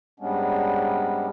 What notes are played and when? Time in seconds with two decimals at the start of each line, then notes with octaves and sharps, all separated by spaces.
0.20 G#2 G3 G#3 B3 C#4 D4